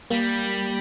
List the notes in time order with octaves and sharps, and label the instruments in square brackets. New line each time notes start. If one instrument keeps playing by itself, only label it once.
[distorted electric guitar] G3 [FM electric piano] A#3